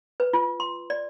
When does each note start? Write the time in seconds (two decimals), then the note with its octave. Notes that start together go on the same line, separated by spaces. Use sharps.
0.20 B4
0.33 F4
0.60 C6
0.90 D5